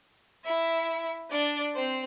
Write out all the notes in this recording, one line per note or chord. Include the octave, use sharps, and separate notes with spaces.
E4 E5
D4 D5
C4 C5